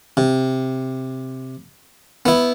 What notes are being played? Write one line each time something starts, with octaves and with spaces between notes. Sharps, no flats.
C3
B3 E4